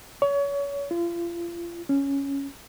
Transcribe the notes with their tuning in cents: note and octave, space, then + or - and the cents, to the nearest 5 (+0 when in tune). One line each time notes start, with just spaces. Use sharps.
C#5 +30
F4 -35
C#4 +0